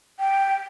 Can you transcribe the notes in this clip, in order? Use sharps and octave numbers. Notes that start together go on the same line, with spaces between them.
G5